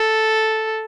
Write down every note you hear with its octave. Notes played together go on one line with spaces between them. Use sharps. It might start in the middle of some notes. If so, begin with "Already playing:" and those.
Already playing: A4